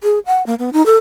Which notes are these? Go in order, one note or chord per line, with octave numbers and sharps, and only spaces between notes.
G#4
F#5
A#3
B3
D#4
A4